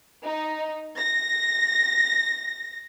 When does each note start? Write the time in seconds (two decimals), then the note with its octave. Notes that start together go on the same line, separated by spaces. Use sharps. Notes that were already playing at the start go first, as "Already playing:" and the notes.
0.24 D#4
0.98 A#6